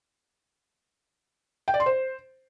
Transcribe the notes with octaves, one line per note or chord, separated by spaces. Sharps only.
G5
D5
C6
C5